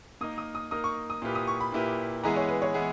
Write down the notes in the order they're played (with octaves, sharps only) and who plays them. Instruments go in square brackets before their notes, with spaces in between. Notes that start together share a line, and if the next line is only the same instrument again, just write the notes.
[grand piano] A#3 D#4 A#4 [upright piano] D#6
[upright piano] D#6
D#6
[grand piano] A#3 D#4 A#4 [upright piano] D#6
[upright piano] C#6
D#6
[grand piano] A#2 A#3 E4 G4 B4
[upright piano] D#6
C#6
B5
[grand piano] A#2 A#3 E4 G4 B4
[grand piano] E3 G#3 B3 E4 G#4 [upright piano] A#5
[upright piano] C#5
B4
C#5
[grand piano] E3 G#3 B3 E4 G#4